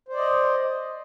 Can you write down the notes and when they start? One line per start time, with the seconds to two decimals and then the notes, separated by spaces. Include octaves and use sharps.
0.08 C5
0.13 D5
0.17 D#5